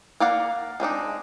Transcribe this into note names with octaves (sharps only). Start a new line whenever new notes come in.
A#3 D5 F5 F#5
G#3 C4 D4 D#4